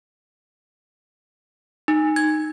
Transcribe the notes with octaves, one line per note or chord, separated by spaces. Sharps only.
D#4
G#6